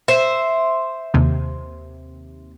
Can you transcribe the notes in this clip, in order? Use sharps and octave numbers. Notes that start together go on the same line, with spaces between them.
C5 E5
D#2 C3